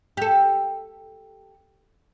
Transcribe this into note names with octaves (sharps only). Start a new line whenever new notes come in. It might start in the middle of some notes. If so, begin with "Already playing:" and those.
G4 A4